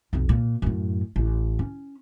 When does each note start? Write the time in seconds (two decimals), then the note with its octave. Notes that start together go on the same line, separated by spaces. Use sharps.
0.13 B1 F2
0.29 A#2
0.62 F#2 A2
1.16 A1
1.59 C#4